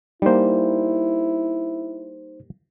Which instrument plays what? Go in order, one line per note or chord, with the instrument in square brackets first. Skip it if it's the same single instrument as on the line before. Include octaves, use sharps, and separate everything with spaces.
[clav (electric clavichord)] G3 A#3 [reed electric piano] D#4 C5 [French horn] E4